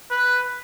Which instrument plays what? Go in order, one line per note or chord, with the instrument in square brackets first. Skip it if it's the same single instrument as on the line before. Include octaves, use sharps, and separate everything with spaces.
[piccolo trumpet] B4